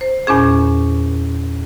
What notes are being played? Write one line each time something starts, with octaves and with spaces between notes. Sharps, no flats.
C5
E2 A#2 C#4 G#4